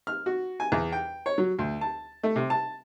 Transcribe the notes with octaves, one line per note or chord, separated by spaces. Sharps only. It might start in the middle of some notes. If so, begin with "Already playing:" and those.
F6
F#4
G#5
E2
G5
C#5
F#3
D2
A5
A3
C3
A5